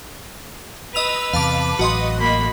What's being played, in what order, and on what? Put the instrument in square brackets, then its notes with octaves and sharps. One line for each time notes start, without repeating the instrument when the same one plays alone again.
[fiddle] B4 [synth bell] D#5 E6 F7
[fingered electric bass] E2 C3 [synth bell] F5 A5 D6
[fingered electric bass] A1 F#3 [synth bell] F#4 D#5 C6
[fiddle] A#3 B5